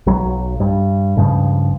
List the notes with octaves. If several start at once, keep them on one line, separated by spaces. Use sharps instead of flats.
B1 F#3
G2
C#2 G2 C#3 F3